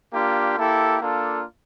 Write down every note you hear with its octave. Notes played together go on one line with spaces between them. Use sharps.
A#3 D4 F4 G4
A#3 E4 G4 A4
A#3 D4 F4 A4